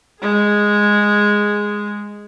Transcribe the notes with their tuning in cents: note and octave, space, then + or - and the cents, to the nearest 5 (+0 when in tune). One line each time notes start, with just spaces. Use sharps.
G#3 -5 G#4 +0